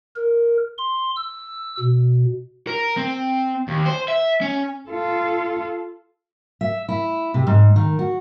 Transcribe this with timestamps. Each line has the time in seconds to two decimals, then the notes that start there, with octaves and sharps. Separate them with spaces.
0.16 A#4
0.78 C6
1.16 E6
1.80 B2
2.67 A#4
2.97 C4
3.68 D#2
3.86 C5
4.08 E5
4.41 C#4
4.89 F4 A4
6.61 E5
6.89 E4
7.34 C3
7.47 G#2
7.76 D#3
7.99 F#4